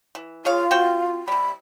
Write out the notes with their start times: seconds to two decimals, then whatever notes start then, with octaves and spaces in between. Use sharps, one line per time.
0.15 E3
0.45 F4 G#4 C#5 F5
0.71 C4 F#4 G5
1.28 C3 G3 B5